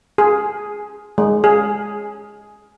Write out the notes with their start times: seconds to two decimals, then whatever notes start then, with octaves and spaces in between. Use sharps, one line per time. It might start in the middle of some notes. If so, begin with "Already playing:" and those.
0.18 G#4
1.18 G#3
1.44 G#4